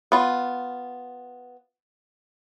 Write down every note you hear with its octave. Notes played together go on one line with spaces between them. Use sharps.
B3 F4